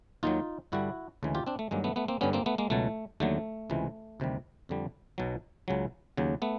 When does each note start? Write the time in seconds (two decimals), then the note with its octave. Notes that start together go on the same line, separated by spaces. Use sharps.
0.23 D#2 D#3 F#3 D#4 F4
0.72 G2 D3 G3 E4 F#4
1.23 D2 C#3 E3 G#3
1.35 F4 G4
1.47 C4 D4
1.59 A3
1.71 G2 D#3 F#3 G#3 A#3
1.84 A3 B3
1.96 A3 B3
2.08 A#3 C4
2.21 G2 D3 G3 B3 C#4
2.33 A#3 C4
2.46 A3 B3
2.58 G#3 A#3
2.70 C#2 B2 F#3 A3
3.20 D#2 D3 F#3 A3
3.70 C#2 C3 E3 G#3
4.20 D2 C3 D#3 G3
4.69 F2 D3 G3
5.18 B1 B2 F#3
5.68 C#2 C#3 F#3
6.17 D#2 C#3 F#3
6.42 A3 B3